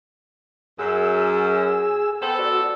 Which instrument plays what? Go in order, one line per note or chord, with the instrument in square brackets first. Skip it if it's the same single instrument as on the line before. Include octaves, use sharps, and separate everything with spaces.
[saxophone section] F#2 [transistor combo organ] G#4 E6
[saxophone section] B3 A4 [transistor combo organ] C5 G5
[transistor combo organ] F#4 D5